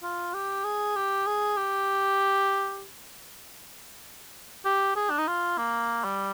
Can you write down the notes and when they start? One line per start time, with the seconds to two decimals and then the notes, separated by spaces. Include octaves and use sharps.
0.03 F4
0.34 G4
0.65 G#4
0.96 G4
1.27 G#4
1.57 G4
4.65 G4
4.96 G#4
5.10 D4
5.18 D#4
5.28 F4
5.58 A#3
6.04 G3